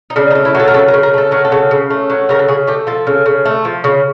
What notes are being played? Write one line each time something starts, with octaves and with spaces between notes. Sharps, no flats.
D#4
C#3 D4
D#4
A3
E4
F#3 A4
A#4
C#3 A4
A#4
C#3
A#4
A3 A4
F#3 A#4
A4
C#3
C#3
A3
F#3
C#3 A#4
A4
C#3 G#4
A3 G4
F3 A4
C#3
C#3
A3
F3
C#3